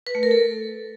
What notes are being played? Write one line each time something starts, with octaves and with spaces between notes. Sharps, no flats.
B4
A3
A#4
A4